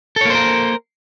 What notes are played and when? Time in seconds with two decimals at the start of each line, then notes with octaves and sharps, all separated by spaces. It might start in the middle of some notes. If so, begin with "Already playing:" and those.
0.16 A4
0.21 C#5
0.25 A#3
0.30 C5
0.35 A#4